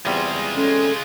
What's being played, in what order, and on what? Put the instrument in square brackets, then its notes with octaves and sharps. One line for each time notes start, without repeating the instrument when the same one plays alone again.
[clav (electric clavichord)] E2 G3 C4 [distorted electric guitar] G#3 F4
[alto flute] C#4 [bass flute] A4